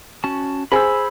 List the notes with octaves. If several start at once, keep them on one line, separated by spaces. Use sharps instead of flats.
C#4 F#4 A5
G#4 C5 G#5 B5 E6